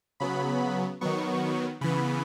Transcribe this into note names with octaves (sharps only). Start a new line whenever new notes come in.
C#3 F#3 B3 B5
D#3 F#3 B3 C#6
C#3 E3 B3 B5